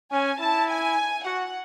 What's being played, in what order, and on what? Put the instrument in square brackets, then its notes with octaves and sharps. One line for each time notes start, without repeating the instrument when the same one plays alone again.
[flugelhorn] C#4 [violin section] G#5
[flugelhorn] E4 [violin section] A5
[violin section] G#5
[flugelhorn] F#4 [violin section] F#5